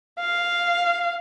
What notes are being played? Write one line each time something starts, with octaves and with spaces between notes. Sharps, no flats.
F5